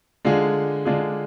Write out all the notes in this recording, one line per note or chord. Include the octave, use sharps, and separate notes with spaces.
D3 G#3 D4 F4 G#4
D3 G#3 D4 F4 G#4